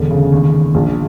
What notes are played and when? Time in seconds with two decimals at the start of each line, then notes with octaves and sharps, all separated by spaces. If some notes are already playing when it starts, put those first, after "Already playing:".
Already playing: E1 D3
0.11 C#3
0.32 D#2
0.53 D#2
0.74 A#1